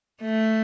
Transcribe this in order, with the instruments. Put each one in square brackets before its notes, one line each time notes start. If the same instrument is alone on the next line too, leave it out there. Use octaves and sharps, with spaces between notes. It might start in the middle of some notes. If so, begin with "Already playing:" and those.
[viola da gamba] A3